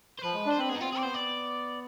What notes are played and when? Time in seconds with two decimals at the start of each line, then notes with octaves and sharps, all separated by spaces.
0.19 C5
0.23 F3 B4
0.34 G#3
0.46 D4 C5
0.58 C4 B4
0.69 B3 G#4
0.76 D#4
0.81 C4 F4
0.92 C4 G#4
0.98 D5
1.03 B3 C5
1.14 D5